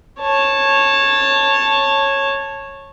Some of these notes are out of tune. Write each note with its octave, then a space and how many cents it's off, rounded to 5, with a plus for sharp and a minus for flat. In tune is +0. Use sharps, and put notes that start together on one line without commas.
C#5 -15 A5 +0